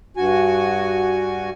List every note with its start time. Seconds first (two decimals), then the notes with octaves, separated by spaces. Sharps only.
0.17 G2 F#4 G#5